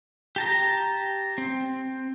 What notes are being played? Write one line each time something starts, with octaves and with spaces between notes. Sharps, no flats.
G4 A5 A#5
C4